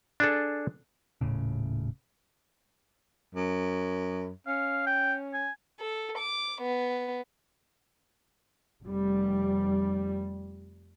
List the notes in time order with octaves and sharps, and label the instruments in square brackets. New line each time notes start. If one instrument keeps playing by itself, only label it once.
[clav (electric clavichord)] D4 G#4 A4
[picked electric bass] D#1 A2 C#3
[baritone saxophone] F#2
[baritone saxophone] C#4 [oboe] F5
[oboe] G5
G#5
[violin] A4
D6
B3
[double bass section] F1 G3